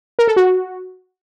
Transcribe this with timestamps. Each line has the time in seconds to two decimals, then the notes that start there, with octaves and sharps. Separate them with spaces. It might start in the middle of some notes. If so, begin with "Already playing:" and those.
0.19 A#4
0.28 A4
0.36 F#4